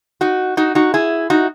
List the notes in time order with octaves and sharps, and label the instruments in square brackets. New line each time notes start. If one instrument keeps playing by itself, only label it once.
[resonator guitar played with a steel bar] D#4 F#4
D#4 F#4
D#4 F#4
E4 G#4
D#4 F#4